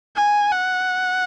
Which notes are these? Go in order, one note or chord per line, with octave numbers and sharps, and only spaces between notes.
G#5
F#5